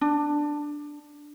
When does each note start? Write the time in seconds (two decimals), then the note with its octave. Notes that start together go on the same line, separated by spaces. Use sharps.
0.01 D4